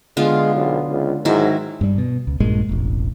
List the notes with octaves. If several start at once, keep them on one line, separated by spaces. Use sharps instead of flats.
D3 G#3 B3 F4
B1
C#2
G#2 D#3 F#3 E4
G2 G3
B2
C#2
A#1 G2 A#2 G#3
E1 A1